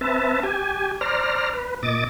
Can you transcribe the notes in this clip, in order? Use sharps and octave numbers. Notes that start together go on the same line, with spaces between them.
C4 B4 E5 A5
G4 G#5
C5 D5 A#5 F6
B4
A#2 D#5 D6 A6